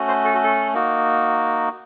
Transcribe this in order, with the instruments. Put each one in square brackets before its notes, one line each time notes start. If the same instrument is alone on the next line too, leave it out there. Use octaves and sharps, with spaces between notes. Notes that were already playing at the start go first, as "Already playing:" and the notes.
Already playing: [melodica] A3 C#4 F#4
C5
A4
F#4
A4
A#3 D#4 F#4